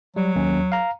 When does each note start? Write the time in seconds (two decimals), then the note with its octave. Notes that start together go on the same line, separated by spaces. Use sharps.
0.16 F#3 G3
0.36 D#2 C#4
0.72 F5 A#5